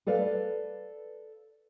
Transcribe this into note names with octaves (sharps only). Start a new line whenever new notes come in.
A4 B4 D5 F5